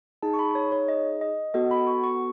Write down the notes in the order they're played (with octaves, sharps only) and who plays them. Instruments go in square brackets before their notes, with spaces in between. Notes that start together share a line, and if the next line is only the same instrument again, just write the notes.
[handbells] D#4 G#4 A5
C#6
B5
C#5
C#5
D#5
D#5
B3 F#4 A4 D#5
B5
C#6
C#6